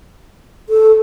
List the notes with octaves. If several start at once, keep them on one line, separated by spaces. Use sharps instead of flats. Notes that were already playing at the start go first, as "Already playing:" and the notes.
A4